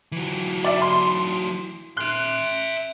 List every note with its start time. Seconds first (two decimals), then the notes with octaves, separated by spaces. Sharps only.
0.12 E3 F#3
0.64 D5 E5
0.82 C6
1.97 E5 C6 F#6